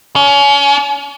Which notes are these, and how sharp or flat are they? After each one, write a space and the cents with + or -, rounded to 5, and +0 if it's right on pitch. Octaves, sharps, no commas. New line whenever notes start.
C#4 +30